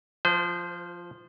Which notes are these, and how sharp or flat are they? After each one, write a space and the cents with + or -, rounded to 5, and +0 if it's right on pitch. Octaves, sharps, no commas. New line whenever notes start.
F3 +0 C5 -35